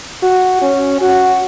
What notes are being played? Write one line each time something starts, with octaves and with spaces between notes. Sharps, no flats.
F#4
C#4
F#4